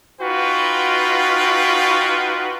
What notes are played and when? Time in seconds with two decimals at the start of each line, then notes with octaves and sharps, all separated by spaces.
0.21 D#4 F4 F#4 B4 G5